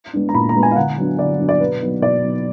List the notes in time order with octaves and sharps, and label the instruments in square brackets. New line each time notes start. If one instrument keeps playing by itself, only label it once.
[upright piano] G#3 B3 D4
A#5
A#2 B5
A#5
G#3 B3 D4
G#5
F5
D3 F#5
F#3 B3 D4
D3 D5
F#3 B3 D4
D5
B2 B4
F#3 B3 D#4
B2 D5
F#3 B3 D#4